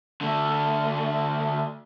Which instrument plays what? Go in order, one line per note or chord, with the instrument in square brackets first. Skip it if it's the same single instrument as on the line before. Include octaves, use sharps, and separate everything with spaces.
[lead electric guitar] D3 A3